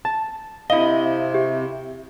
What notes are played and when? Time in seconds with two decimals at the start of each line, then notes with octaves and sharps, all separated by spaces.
0.05 A5
0.70 C3 E4 D#5 F5 G7
1.34 G4